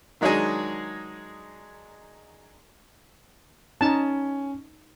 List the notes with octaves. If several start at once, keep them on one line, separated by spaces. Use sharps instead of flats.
D#3 F#3 G#3 D4 D#4 G#4
C#4 D#4 A5